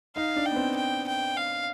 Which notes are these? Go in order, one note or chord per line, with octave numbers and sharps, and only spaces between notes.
D#4 F5
D4
G5
B3
C4
G5
G5
F5